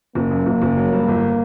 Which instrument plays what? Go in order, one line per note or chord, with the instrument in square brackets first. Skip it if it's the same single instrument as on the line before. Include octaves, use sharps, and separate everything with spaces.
[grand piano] F#1 [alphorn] A#3
[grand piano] F#2
F#1
F#1
F#3
G2
G1